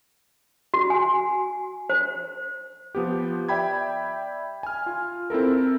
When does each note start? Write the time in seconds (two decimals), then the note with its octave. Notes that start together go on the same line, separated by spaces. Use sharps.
0.74 F#4
0.90 G#5
1.90 C5
2.95 F3 B3 G4
3.49 D5 E5 G5 B5 G#6
4.63 G#5 F6
4.86 F4
5.30 C4 E4 A4 A#4